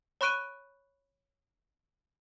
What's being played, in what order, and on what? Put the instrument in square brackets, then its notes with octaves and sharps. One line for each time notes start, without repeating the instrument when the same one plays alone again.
[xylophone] C#5 B5 C#6 F#6 D7 D#7